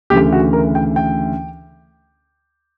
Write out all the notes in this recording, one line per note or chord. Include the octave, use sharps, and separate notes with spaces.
D2 C#3 E3 G4
F#4
A#4
G5
G5